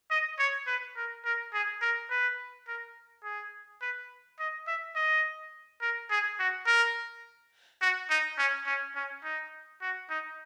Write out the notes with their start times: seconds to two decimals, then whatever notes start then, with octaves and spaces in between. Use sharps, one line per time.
0.11 D#5
0.39 C#5
0.67 B4
0.97 A#4
1.25 A#4
1.54 G#4
1.82 A#4
2.10 B4
2.68 A#4
3.24 G#4
3.82 B4
4.39 D#5
4.67 E5
4.95 D#5
5.82 A#4
6.10 G#4
6.39 F#4
6.67 A#4
7.82 F#4
8.10 D#4
8.38 C#4
8.67 C#4
8.96 C#4
9.24 D#4
9.82 F#4
10.10 D#4